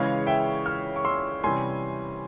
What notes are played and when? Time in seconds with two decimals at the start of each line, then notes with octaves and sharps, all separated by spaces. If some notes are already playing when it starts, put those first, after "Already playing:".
Already playing: C#3 E3 G#3 C#4 C#5 F5
0.27 E5 G5
0.66 C#6 F6
0.96 C#6
1.05 C6 E6
1.44 C3 E3 G3 C#4 G#5 C6